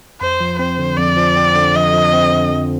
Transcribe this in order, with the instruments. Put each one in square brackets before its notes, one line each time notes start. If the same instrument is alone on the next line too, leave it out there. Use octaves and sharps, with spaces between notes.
[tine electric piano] F2 [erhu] C5
[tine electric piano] F3
[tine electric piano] C4 [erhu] C5
[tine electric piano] D3
[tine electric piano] F2 [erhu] D5
[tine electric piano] F3
C4
D3
[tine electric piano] F2 [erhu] D#5
[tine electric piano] F3
C4
D3
F2